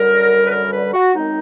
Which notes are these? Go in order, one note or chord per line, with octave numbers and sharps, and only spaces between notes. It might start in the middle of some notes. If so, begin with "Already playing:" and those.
Already playing: F#2 D3 G3 A#4
B4
A#4
B4
F#4
F#2 D#3 G#3 C4 D#4